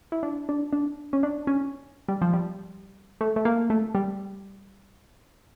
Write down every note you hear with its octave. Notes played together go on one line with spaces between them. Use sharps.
E4
D4
D4
D4
C#4
D4
C#4
G3
F3
G3
A3
A3
A#3
A3
G3